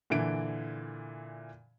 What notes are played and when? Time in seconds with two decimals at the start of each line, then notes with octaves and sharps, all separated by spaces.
0.10 A#2 D3 E3 D7